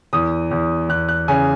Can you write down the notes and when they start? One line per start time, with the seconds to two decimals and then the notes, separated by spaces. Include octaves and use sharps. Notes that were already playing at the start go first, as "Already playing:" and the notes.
0.13 E2 D#6
0.51 E2
0.89 E2 F#6
1.09 F#6
1.28 C#3 G#5